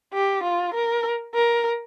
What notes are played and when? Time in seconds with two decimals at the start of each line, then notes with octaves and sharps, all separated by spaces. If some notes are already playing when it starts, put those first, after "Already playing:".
0.13 G4
0.43 F4
0.74 A#4
1.35 A#4